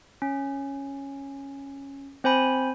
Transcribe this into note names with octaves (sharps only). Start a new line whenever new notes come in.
C#4
C4 C5 G#5 B5